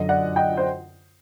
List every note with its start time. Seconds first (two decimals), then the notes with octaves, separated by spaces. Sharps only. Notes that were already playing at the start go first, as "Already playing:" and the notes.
Already playing: F#2 D3 F#3 D#5
0.09 D5 F#5
0.36 D#5 G5
0.57 C5